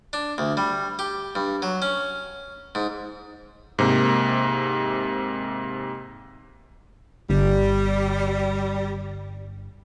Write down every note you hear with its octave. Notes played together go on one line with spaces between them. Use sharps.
D4
D2
G3
G4
G2
F#3
C#4
G#2
G#2 C3 A#3
G1 G3